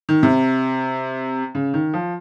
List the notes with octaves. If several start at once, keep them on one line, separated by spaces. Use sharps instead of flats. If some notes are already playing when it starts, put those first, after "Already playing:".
D#3
C3
C#3
D#3
F3